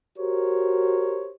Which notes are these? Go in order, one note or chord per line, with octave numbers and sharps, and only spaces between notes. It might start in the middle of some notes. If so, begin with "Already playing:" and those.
F#4 G4 A#4 C5 C#5